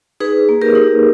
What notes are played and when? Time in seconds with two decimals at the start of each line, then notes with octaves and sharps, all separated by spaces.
0.20 D#4 G#4 B4
0.49 A#3
0.62 G4 A#4
0.75 D#4